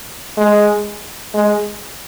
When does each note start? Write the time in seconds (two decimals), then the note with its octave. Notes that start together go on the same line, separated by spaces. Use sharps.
0.37 G#3
1.34 G#3